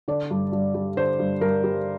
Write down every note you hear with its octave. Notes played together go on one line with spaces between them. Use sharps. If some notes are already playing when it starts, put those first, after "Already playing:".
D3 D5
G2
G2
G3
D3 C5
G2
G2 A#4
G3